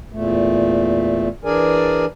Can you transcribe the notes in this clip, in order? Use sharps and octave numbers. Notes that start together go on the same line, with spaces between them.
E2 A#2 A3
E3 D4 G#4 A#4 D5 G#5